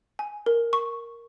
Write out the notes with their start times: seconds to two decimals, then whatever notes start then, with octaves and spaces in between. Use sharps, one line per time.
0.19 G#5
0.46 A#4
0.73 C#6